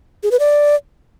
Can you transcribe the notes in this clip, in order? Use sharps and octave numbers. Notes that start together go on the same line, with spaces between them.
G#4
B4
D5